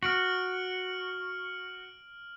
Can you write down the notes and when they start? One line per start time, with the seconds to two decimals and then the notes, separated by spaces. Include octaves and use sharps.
0.03 F#4 F6 D7 F#7